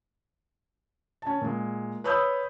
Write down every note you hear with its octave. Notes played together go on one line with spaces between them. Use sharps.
C#4 A5
A#2 G#3
B4 C#5 B5 D#6 E6 G6